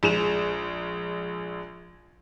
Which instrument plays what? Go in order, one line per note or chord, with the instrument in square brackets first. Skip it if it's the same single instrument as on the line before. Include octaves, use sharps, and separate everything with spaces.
[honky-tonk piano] A#1 G#3 E7 F7